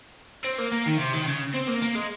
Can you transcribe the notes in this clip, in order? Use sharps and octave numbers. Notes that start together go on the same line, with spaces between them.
C4
A#3
A#3
D#3
C3
D#3
C#3
C4
A#3
A#3
G#3